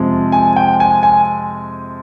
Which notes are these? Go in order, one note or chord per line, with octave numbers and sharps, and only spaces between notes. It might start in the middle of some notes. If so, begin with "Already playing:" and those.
Already playing: F2 C3 F3 G#3
G#5
G5
G#5
G#5